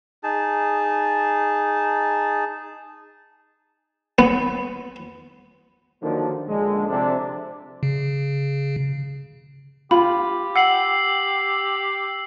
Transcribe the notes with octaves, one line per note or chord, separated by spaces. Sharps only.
D#4 G#4 A5
B3
D3 D#3 F3 F#3 A#3 D4
A#1 D3 G#3
F2 C3 D4
C#3
F4 G4 B5
F#5 E6 C7 F#7